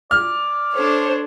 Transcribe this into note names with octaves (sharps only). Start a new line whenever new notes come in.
D5 F6
D4 A4 C5 C#5